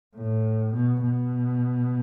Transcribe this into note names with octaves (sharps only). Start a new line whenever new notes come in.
A2
B2
B2